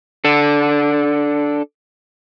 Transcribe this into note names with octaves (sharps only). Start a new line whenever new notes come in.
D4 A4